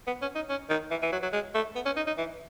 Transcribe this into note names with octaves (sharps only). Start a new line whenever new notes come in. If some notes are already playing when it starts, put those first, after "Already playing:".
B3
C#4
D#4
C#4
D#3
E3
E3
F#3
F#3
G#3
A3
B3
C#4
D#4
D#4
E3